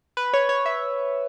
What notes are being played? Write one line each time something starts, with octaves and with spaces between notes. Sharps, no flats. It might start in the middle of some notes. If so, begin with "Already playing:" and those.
B4
C#5
C#5
E5